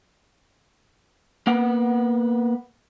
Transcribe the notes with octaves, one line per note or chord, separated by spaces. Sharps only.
A#3 B3 F#5